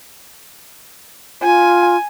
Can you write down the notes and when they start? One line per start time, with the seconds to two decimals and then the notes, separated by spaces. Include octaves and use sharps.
1.42 F4 G#5